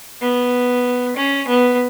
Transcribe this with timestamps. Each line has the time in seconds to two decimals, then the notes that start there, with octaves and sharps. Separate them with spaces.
0.22 B3
1.17 C#4
1.48 B3